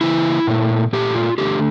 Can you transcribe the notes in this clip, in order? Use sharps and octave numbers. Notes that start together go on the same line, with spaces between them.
C#3 E3 A#3 E4
A#2 A3
A#2 A3 G4
F4
D3 A3 G4